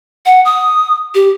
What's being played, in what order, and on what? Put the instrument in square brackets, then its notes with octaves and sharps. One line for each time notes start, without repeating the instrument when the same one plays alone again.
[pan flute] F#5
D#6
G4